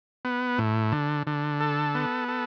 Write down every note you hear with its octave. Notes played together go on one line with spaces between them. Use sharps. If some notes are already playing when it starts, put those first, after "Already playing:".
B3
A2
D3
D3
A4
B3
A4